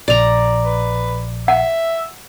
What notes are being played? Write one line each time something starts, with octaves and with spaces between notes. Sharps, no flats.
A#1 D5 A#5
B4
E5 F#5